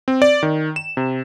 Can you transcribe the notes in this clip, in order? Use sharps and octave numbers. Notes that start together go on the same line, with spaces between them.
C4
D5
D#3
E7
C3